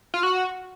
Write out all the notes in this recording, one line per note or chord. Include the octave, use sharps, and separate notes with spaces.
F4
F#4